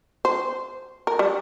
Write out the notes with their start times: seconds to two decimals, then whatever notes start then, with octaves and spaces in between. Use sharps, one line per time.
0.25 C5
1.07 A#4
1.19 G3